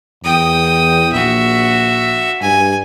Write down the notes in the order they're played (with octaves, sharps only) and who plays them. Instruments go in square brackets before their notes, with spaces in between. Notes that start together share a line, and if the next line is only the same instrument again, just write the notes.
[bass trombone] E2 [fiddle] G5 D#6
[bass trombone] A#1 [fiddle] F#4 E5
[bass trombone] G2 [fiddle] G#5